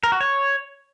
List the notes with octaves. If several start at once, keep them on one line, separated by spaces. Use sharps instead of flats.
A#4
F#4
C#5